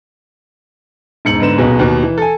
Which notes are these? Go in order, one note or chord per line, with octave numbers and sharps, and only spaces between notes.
E1 G#2 C#7 F#7
G#2 D3 B3 E7
D#1 B1 B2 G#4
D#2 B2
E3
A4 G#5